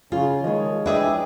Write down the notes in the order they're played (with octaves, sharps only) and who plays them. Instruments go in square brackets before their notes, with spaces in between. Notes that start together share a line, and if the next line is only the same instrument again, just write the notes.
[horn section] C#3 [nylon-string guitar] F4 [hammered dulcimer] G#4
[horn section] D#3 [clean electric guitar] F3 G#3 [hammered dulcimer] C#5 D#5
[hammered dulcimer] E3 G5 D6 [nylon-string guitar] D4 G#4 B4 [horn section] D#5 E5